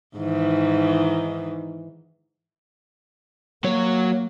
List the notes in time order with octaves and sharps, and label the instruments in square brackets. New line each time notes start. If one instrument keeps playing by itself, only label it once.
[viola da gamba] G#2 D#3 E3
[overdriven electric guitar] F#3 C#5 [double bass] A#3